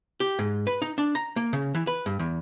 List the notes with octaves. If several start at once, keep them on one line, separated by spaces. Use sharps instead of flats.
G4
G#2
B4
D#4
D4
A#5
A#3
C#3
E3
B4
G2
E2